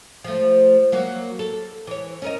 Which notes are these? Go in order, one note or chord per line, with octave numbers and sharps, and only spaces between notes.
F3 A3
F#3 A#3 F#4
A4
E3 C#5
C#4 A#4 D#5